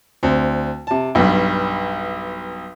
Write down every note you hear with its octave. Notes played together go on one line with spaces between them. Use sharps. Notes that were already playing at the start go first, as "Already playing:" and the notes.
D2 C4
C3 A5
B1 G2